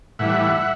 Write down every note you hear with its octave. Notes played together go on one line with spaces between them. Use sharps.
A2 E3 G3 E5 F#5